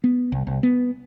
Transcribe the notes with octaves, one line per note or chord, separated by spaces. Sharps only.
B3
C2
C2
B3